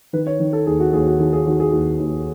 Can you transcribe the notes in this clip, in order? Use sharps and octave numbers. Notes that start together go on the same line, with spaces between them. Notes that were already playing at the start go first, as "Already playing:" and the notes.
D#3 B4
C#5
D#3
A4
D#2 G#4
F#4
D#2 G#4
F#4
D#3 G#4
G#4
D#3 F#4
G#4
D#2 F#4
D#2